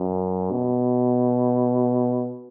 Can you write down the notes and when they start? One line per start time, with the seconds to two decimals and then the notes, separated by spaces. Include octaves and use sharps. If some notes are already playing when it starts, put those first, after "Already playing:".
Already playing: F#2
0.52 B2